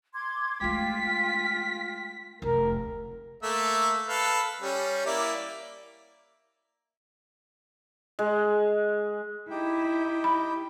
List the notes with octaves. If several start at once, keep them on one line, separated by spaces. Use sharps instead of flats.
C6 D6 G#6
G#3 A3 F4 G5 B6
F1 D2 A#4
A3 A#3 E5
A4 B4 F5
G3 C#4
A#3 E4 D5
G#3
D#4 E4 G4 G5
B5